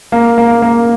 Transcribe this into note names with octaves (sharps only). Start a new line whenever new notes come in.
A#3
A#3
A#3